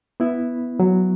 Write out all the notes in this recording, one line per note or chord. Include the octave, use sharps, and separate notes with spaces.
B3 E4
F#3